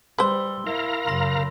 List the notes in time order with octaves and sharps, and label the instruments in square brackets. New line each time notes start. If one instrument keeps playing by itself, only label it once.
[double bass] G3 [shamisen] B4 C5 [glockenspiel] C6 E6 G7
[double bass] E4 [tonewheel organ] A#4 F5 A#5
[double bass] F#2 C#3 [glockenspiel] B5 C6 A#6